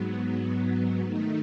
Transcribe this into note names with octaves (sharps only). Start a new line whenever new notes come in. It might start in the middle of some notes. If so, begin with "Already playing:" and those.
Already playing: G#2 F#3 B3
D#3 A3 D#4